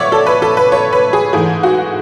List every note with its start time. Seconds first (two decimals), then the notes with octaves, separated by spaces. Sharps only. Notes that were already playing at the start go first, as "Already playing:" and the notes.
Already playing: A2 C#5 D5 E5 F#5
0.12 A4
0.26 B4
0.42 A4
0.57 B4
0.72 C#5
0.93 B4
1.13 G#4
1.33 G#2 E3 A3 G#4
1.63 F#4